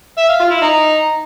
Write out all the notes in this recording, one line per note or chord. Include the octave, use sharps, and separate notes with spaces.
E5
F5
F4
E4
D#4